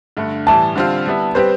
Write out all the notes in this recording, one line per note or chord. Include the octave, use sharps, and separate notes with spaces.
G2 D3 A3
A2 E3 G3 A5
D3 G3 C4 F4
G3 B3 E4
G3 C4 G4 B4 C5